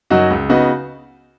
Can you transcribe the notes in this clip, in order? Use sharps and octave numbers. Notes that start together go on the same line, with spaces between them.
F#2 F#3 D#4 F#4
C#2
C#3 B3 D#4 F#4